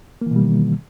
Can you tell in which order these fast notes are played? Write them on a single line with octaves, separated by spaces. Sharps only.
A#3 E3 B2 G3 D#3